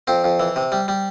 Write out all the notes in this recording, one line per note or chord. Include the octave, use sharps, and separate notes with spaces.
F2 C4
F2
E3
C3
G3
G3